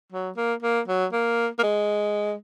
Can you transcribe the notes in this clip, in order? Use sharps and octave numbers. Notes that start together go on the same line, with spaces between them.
F#3
A#3
A#3
F#3
A#3
A#3
G#3